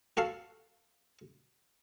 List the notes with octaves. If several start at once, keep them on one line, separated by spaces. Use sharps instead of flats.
F#4 A4 F5 A5